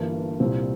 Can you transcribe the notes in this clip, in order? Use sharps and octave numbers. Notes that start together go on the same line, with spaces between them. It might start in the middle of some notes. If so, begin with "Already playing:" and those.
Already playing: G1 G2 E3 A#3 D4
C2 A#2 G3 C4